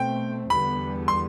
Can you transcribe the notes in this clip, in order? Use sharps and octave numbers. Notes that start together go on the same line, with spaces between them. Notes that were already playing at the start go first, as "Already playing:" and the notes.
Already playing: B2 A3 C4 G5
E2 D3 G3 B3 B5
C6